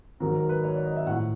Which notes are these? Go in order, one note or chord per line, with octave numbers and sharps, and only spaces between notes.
G#2 D#3 F#3 A#4
A#4
B4
C#5
D5
D#5
E5
A2 F3 F#5